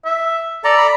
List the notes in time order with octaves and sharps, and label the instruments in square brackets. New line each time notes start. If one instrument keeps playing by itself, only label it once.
[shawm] E5
[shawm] A4 [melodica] D5 A#5
[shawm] B5